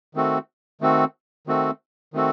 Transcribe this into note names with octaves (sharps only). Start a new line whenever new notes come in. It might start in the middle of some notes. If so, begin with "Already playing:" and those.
D#3 A3 C4 F#4 A4
D#3 A3 C4 F#4 A4
D#3 A3 C4 F#4 A4
D#3 A3 C4 F#4 A4